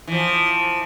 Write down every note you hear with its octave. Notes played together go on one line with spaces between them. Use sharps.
E3 F3